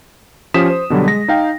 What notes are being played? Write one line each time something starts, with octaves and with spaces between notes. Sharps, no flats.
F3 C#4 G4 D#6 B6 E7
C5
B2 D3 F#3 G3
G#3 A#6
D#4 F5 G5